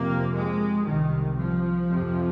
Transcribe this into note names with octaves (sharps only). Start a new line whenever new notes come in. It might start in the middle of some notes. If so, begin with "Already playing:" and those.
Already playing: F2 C3 A#3
G#3
C2 C3 D#3
F3
F2 C3